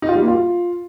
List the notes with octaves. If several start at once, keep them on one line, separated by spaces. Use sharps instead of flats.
D#4
F4
G3
A#3
F4